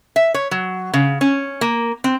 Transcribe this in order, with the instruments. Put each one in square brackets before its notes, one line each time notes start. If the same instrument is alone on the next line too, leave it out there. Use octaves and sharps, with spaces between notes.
[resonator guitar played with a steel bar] E5
C#5
F#3
C#3
C#4
A#3
C4